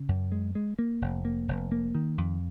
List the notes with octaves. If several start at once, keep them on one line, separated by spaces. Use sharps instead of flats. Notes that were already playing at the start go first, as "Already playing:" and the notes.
Already playing: C#3
F#2
G#3
G#3
A#3
F1
A#3
F1
A#3
D#3
F2